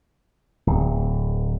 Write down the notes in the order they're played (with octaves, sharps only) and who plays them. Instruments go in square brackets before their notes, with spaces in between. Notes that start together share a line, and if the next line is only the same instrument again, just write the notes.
[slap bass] D1